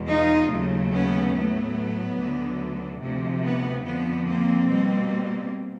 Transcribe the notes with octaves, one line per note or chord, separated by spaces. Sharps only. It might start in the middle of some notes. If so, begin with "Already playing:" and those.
Already playing: E2 B2 G#3
D#4 F4
D#2 C#3 F#3 A3
B3 C#4
A2 F#3 A3 B3
D2 D3 F#3
D2 C3 F3
B3
F2 D3 F3 B3
A#3 C4
B2 G3 A#3